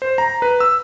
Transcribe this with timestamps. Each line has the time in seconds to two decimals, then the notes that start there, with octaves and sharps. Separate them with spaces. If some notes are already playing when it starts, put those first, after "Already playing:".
0.02 C5
0.18 A#5
0.42 B4
0.60 E6